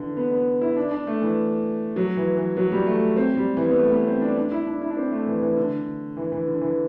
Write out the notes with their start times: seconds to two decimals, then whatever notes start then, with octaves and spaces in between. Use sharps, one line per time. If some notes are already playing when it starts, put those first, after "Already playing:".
Already playing: D3 E3
0.17 B3
0.31 B3
0.61 E4
0.77 D4
0.91 D4
1.07 A3
1.22 E3
1.96 F#3
2.17 E3
2.37 E3
2.57 F#3
2.72 G3
2.87 A3
3.17 C4
3.37 G3
3.57 E3
3.69 B3
3.77 A3
3.92 B3
4.07 C4
4.21 D4
4.37 D4
4.52 E4
4.67 D4
4.82 E4
4.90 D4
4.97 C4
5.12 A3
5.27 E3
5.42 E3
5.57 D3
6.17 E3
6.32 E3
6.47 D3
6.61 E3